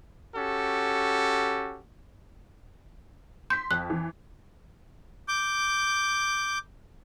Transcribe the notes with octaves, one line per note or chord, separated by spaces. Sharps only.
C#4 F#4 G4 A4
C6 G6 B6
F2 F#6
E3
D6 G6